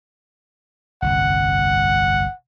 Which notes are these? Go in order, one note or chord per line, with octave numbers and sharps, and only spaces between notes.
G1 C2 F2 F#5